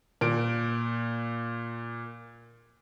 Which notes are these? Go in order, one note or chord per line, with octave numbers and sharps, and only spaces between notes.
A#2 D7